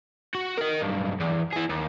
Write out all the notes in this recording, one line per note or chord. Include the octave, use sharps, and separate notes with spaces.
F#4
A#4 D#5
B1 G2
E2
E4 G#4
D#2